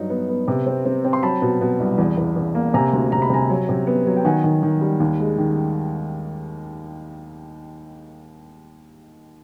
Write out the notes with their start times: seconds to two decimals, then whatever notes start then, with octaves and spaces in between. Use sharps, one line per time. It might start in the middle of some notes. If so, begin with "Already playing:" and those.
Already playing: G2 F#3 D#4
0.10 B3
0.29 B3
0.48 C3
0.66 C4
0.85 C4
1.05 C4
1.13 C6
1.23 F#3 A5 B5
1.42 B2
1.61 B2
1.80 C2
1.98 E2
2.17 E2
2.36 E2
2.55 A#3
2.74 C3 G#5 A#5
2.93 D2
3.12 C3 A#5
3.22 B5
3.30 C3 G#5 A#5
3.50 F#3
3.69 C3
3.87 B3
4.07 F#3
4.17 G5
4.25 D#3 F#5 G#5
4.44 D#3
4.63 D#3
4.81 G3
5.00 D#2
5.20 G#3
5.38 D#3